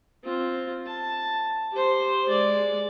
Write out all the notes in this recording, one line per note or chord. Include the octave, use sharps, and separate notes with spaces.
C4 F4
A5
G4 C5
G#3 D5